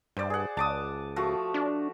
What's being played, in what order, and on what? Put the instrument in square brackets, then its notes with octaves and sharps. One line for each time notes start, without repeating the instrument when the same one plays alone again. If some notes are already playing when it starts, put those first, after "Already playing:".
[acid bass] G2 [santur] C5 D5
[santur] G#4 F#5
[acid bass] C#2 [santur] A5 D6 D#6
[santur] F3 A3 F#4
[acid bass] D4